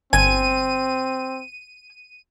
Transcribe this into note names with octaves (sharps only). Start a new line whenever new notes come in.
G1 C4 G#5 D#7